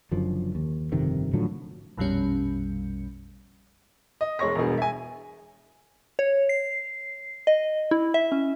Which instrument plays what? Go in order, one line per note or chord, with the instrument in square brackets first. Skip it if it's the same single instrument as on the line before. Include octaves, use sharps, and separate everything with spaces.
[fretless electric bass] F#1 F#2 D3 F3
D#2
G1 F2 C3 D#3
A2 D3 F3 F#3
[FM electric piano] A#1 F2 B2 G3 C#4
[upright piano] D#5
E1 G#3 C#5 C#6 A#6
E1 G2 B2 G#4
E5 G#5
[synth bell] C#5
C7
D#5
E4
E5
C#4